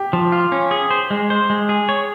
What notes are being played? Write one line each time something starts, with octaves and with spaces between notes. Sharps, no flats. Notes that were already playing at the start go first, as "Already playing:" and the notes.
Already playing: G4
F3
F4
C#4
G#4
C5
G#3
C5
G#3
G#4
C#5